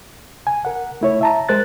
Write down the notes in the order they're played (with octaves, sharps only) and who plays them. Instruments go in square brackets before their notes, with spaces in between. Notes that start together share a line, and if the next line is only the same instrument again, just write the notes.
[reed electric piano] G#5
A#4 F#5
A3 E4 C#5
E5 A5 A#5
G#3 A#4 C5 F#6 A6